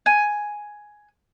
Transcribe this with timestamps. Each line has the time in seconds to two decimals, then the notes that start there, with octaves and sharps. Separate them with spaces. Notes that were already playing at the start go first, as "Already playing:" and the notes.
0.06 G#5